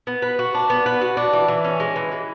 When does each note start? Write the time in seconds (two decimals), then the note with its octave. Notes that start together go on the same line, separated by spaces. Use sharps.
0.07 B3
0.22 B4
0.39 F#4
0.54 D4
0.70 B3
0.86 B4
1.01 F#4
1.17 D4
1.33 E3
1.48 E3
1.64 C#4
1.80 G#3
1.96 E3
2.12 E3